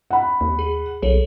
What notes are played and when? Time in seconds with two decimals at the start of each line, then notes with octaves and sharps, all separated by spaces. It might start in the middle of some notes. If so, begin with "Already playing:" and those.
0.10 F#5 B5
0.41 D#2
0.59 G#4
1.02 B1 G#4 A4 C#5